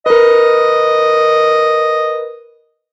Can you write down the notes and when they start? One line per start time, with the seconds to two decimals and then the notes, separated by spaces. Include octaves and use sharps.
0.06 A#4 B4 D#5